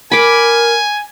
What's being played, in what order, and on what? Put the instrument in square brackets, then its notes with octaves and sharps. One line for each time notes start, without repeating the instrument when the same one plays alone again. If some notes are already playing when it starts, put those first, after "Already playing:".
[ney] A#4 [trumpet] G#5 [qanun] B5 D6